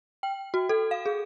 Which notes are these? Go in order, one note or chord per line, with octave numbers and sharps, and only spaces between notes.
G5
F#4
A4
F5
G#4